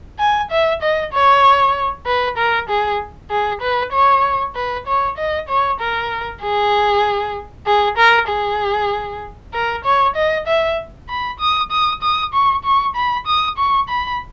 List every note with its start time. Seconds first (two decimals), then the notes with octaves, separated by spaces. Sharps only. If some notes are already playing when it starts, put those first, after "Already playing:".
0.19 G#5
0.51 E5
0.82 D#5
1.13 C#5
2.06 B4
2.37 A#4
2.69 G#4
3.30 G#4
3.61 B4
3.93 C#5
4.55 B4
4.87 C#5
5.18 D#5
5.49 C#5
5.80 A#4
6.43 G#4
7.66 G#4
7.97 A#4
8.29 G#4
9.54 A#4
9.85 C#5
10.16 D#5
10.47 E5
11.09 B5
11.40 D#6
11.71 D#6
12.02 D#6
12.33 C#6
12.64 C#6
12.96 B5
13.27 D#6
13.58 C#6
13.89 B5